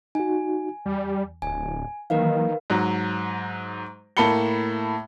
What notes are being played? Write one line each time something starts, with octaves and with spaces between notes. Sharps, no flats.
D#4 F#4 G#5
E2 G3
D1 G#5
D#3 E3 F#3 A#3 A#4 B4 F5
G#2 F#3
A2 A#3 A5 B5 C#7 G7